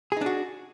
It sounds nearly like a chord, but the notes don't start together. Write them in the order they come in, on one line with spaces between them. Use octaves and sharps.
G#4 D#4 D4 F#4